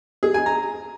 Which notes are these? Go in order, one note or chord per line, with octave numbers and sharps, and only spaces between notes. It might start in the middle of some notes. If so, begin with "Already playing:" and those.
G#4
G#5
A#5